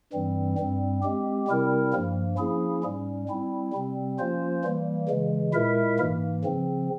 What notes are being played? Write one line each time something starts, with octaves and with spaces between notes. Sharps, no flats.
G2 E3 G3 C4
G2 G3 C4
G#3 C4 G4
C3 G3 C4 E4 A#4
G2 F3 A#3
F3 A#3 C#4 E4 G#4
G#2 G3 C#4
G3 C4 E4
C3 G3 C4
F3 A#3 C#4 F4 C5
E3 G3 A#3
C#3 E3 G#3
A#2 G#3 E4 A#4 E5
G#2 E3 A#3
C#3 F3 C4